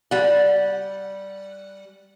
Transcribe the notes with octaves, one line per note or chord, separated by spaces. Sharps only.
G3 F#5